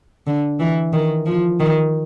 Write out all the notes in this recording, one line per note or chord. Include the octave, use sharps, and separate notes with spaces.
D3
E3
D#3
F3
D#3